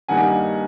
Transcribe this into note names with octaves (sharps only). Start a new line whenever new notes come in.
G2 D#3 G3 A#3 D#4 F#5 G#5